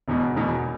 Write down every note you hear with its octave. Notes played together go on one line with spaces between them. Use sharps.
E1 E2 B2
E1 E2 B2